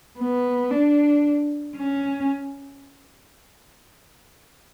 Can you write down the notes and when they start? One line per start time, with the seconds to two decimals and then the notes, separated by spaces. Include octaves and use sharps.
0.19 B3
0.71 D4
1.77 C#4